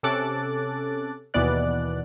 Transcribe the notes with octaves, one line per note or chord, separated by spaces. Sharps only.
C3 C#4 A4 D6 F#6 A6
D#2 B2 E3 B3 D5 F#6